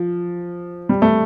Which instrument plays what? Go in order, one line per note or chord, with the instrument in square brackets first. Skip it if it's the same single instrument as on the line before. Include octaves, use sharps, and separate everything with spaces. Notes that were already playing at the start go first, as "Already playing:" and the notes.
Already playing: [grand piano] F3
G3
A3